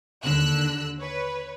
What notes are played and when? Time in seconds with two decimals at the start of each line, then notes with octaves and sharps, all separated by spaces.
0.24 D#2 D3 E6 F#6
0.99 B4 C#5